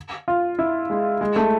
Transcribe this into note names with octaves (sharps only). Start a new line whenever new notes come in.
F4
E4
G#3
G#3
A3